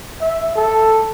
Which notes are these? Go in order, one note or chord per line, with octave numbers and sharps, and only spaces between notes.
E5
A4